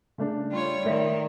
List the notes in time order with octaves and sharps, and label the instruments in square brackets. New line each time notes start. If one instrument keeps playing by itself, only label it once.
[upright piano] C#3 A3 D4
[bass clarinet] G3 [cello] F4 C#5
[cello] D#3 [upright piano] A3 [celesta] A#4 D5 E5